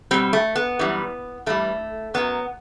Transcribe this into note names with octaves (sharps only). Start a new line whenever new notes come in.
B2 G3 C4
A3
B3
F#2 E3 G3
G2 E3 G3 A3
F#2 F#3 B3